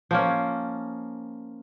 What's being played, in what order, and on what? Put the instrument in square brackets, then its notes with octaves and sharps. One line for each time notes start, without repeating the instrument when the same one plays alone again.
[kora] F3 A#3 C#4